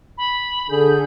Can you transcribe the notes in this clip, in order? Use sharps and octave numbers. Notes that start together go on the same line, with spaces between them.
B5
D3 G#4 A4 G6